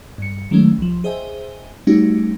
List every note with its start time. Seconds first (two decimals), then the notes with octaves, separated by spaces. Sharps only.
0.18 G2 C#7
0.51 D#3 F#3 G#3 A3 C#4
0.78 C2 F3
1.04 G#4 C5 D#5 E5 G5 G#5
1.87 G3 A3 C#4 D#4 F#4 G4